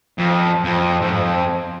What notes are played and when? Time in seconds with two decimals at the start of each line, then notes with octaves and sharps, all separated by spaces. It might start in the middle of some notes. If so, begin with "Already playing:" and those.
0.18 F2
0.64 F2
1.02 G#2
1.11 F2